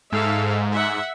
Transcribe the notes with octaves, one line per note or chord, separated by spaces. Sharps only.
G#2 A4 E5 F5
E5 F#5